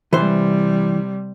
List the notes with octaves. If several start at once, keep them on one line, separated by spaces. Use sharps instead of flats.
C3 E3 G3 C5